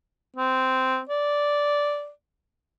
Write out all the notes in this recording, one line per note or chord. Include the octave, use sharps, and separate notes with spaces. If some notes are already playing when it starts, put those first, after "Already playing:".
C4
D5